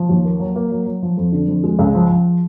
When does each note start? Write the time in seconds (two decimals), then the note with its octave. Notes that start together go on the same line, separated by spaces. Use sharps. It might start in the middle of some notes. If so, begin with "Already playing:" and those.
Already playing: F3
0.09 D#2
0.25 A#3
0.40 F#3
0.56 A#3
0.72 F#3
0.86 F#3
1.02 F3
1.17 F2
1.32 D3
1.48 F2
1.63 G#3
1.79 C#2
1.95 F3
2.10 F3